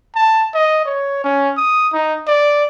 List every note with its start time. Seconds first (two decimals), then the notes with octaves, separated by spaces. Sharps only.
0.15 A5
0.54 D#5
0.85 C#5
1.24 C#4
1.57 D#6
1.93 D#4
2.27 D5